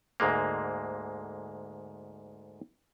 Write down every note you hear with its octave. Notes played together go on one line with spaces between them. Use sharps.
D2 G#2 G#3 A#3